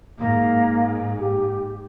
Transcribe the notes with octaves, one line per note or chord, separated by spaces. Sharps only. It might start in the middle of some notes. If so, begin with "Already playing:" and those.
G#2 A#3
G4